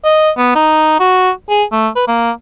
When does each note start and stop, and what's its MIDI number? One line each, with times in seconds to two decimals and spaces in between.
0.05 0.31 75
0.38 0.54 59
0.55 0.96 63
1.00 1.31 66
1.49 1.64 68
1.72 1.89 57
1.96 2.05 71
2.08 2.31 58